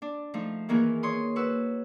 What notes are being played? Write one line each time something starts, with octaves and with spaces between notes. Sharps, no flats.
D4
F3 A3 D#4
D#3 E3 A#3 B3 D#4 G#4
C#5 C6 D#6
F#4 B4 E6